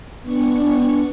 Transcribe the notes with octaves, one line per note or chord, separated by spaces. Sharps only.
B3 D4 C#6